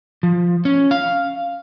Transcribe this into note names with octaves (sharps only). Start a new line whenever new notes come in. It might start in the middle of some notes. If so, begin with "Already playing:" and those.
F3
C#4
F5